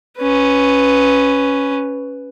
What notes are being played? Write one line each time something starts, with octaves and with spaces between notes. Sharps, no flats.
C#4 B4